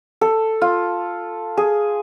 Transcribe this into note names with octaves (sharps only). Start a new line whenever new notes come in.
A4
F4
G#4